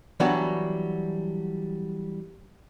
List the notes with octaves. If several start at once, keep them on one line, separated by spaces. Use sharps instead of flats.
E3 F#3 G3 B3 D4 F#4